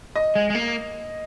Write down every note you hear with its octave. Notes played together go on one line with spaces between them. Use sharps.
D#5
G#3
G#3
A#3